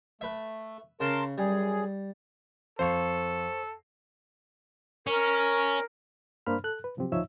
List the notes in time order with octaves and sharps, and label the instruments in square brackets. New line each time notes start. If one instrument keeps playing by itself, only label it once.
[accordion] A3 [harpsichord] B4 E5
[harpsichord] C#3 [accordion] A#4 A5 C6
[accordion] F#2 G#4 [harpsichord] G3
[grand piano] F2 F5 C7 [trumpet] A4 [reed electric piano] C5 C#6
[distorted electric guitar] C#4 [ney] A#4
[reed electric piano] G2 A#3 D4 C5 B5 F6
A4 F#6
B4
C3 F3 F#3 C4 G4
D2 F3 D#4 C#5 E5 E6